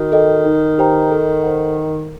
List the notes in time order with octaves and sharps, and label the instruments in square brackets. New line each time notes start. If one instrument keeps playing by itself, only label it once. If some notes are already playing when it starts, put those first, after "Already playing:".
Already playing: [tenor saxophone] D#3 [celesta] F#4
[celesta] A4 D#5 G5
D#4
G4 C5 G5 A#5
A4
C5 F#5
A#4